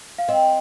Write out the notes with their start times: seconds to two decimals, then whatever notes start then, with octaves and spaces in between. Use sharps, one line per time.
0.18 F5
0.28 C4 D#5